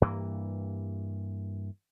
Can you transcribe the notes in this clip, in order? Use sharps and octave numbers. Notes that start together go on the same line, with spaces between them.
G2 E3 A#3